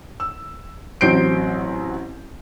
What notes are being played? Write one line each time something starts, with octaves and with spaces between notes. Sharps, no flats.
E6
A1 F#3 C4 G6 C7 D7